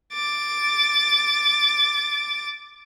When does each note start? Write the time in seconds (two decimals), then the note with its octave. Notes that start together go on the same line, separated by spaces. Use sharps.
0.13 D6 A6